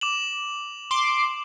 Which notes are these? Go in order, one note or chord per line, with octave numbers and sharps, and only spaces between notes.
D6 E7 F#7
C6 D6